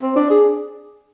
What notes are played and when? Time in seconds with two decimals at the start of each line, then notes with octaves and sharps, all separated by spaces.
0.02 C4
0.16 D4
0.30 G#4